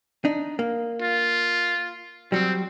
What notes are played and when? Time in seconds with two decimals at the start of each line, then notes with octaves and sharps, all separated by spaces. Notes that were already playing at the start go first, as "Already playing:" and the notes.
0.25 D4 D#4
0.59 A#3
1.02 F4
2.32 F#3 G3 C4